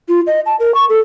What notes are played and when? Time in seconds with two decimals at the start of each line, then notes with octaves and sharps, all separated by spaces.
0.09 F4
0.27 D#5
0.46 A5
0.60 A#4
0.74 C#6
0.89 A4